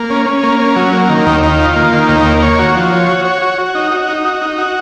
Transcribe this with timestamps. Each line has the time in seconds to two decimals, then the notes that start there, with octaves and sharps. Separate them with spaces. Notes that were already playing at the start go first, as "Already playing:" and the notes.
Already playing: A#3
0.10 C#4
0.26 C#4
0.43 A#3
0.60 C#4
0.76 F#3
0.93 A#3
1.09 D#3
1.26 D#2
1.43 D#3
1.59 F4
1.76 A#3
1.93 D#3
2.09 D#2
2.26 A#3
2.42 C#5
2.59 F#4
2.75 F3
2.92 C#5
3.09 F#4
3.25 C#5
3.42 F#4
3.58 F#4
3.75 D#4
3.92 F#4
4.08 D#4
4.25 F#4
4.41 D#4
4.58 F#4